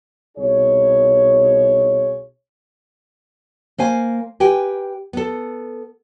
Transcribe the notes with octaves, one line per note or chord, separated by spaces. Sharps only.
C2 B2 D#4 G#4 C#5
A#3 C5 G#5
G4 B4 G5 G#5
B3 A4